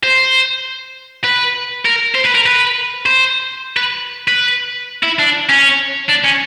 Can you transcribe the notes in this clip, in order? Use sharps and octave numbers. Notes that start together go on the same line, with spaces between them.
C5
B4
A#4
C5
B4
A#4
B4
C5
B4
B4
E4
D4
C#4
D4
C#4